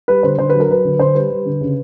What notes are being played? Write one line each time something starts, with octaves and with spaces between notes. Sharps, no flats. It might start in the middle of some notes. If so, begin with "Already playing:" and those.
G3 B4
D3 C5
D3 C5
F#3 B4
A#4
F#3 B4
D3
D3 C5
G3 B4
G3
D3
C#3